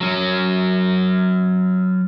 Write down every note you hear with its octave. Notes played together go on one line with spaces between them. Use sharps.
F#3 C#4